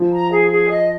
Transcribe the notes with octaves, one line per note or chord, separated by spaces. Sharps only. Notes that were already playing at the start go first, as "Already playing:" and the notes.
Already playing: F3
A#5
G#4
G#4
D#5